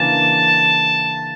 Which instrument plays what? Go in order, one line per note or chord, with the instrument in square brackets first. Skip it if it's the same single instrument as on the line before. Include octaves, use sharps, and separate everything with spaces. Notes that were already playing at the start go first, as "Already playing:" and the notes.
Already playing: [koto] C#3 E3 A#3 D4 [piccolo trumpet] A5